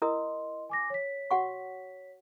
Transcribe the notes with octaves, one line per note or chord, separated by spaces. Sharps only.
E4 A#4 D#5 C6 D#6
G#5 D6 A#6
C#5 B6
F#4 F#5 C#6